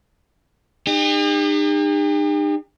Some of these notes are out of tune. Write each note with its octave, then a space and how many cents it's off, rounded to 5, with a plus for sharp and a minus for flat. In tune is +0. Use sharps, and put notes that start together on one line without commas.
D#4 -40 G4 +45